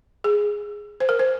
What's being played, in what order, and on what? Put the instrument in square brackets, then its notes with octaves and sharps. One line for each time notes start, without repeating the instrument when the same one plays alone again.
[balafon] G#4
C5
A#4
C5